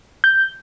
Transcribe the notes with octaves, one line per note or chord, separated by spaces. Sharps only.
G6